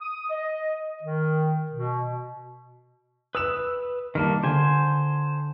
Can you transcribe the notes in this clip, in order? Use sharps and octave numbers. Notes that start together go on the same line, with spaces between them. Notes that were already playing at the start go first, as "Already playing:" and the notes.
D#6
D#5
D#3
B2
B4 D#6 E6 E7
D#3 G3 A#3 A5 F6
D3 C5 G#5